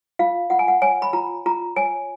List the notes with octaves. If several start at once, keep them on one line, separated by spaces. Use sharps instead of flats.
F4 F5
F4 F#5
G#5
F#5
C#5 G#5
B5
F4 A#5
F4 A#5
C#5 G#5